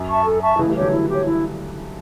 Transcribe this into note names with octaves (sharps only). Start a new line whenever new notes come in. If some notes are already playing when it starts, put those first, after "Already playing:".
Already playing: F#2
E5 A5 C#6
A4
E5 A5 C#6
C#3 E3 E4
A3
E3 G3
G4 C#5
D3 F#3
E4
G4 C#5
E4